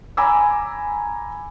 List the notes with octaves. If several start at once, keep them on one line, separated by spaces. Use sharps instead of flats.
G#5 A#5 B5 D6 E6